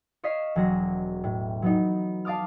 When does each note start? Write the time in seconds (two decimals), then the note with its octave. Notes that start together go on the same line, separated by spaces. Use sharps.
0.24 C#5 D#5 F5 B6 C7 E7
0.56 E1 F#3 G#4 A#6
1.24 A2
1.62 F#3 B3 D#4
2.25 F5 A5 D6 D#6 F6